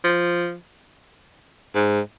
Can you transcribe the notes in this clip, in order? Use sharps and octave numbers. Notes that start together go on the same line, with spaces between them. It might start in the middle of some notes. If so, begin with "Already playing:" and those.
F3
G#2